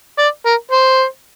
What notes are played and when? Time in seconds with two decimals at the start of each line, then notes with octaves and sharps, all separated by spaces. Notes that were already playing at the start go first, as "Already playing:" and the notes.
0.19 D5
0.46 A#4
0.71 C5